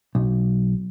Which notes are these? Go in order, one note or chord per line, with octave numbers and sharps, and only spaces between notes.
B1